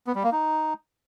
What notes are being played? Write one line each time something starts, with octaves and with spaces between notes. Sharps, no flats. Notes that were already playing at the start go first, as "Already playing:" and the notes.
B3
G3
A#3
D#4